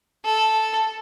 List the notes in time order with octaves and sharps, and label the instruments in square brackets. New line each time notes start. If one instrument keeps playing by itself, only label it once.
[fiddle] A4